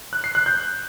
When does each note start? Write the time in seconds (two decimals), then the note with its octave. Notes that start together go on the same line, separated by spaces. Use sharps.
0.13 F#6
0.24 C7
0.35 F#6
0.46 G6